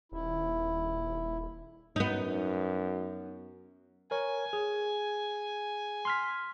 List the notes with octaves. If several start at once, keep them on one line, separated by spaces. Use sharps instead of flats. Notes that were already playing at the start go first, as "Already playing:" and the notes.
D#1 E4
F#2 B3 D#4
A#4 C#5 G#5
G#4
C6 F6 B6